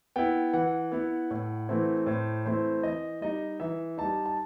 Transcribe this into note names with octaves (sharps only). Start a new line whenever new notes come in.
B3 E4 G5
E3 F#5
B3 E4
A2
E3 A3 C4 E4
A2 C5
E3 A3 C4 E4 C5
E3 D#5
G3 D#4 D#5
E3 E5
G3 D#4 A5
A5